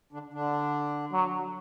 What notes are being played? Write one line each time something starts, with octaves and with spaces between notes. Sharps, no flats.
D3 D4
D3 D4
F#3